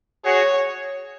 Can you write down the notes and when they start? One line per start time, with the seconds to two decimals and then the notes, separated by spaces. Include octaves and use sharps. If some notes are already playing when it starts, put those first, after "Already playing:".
0.25 F#4 G#4 C#5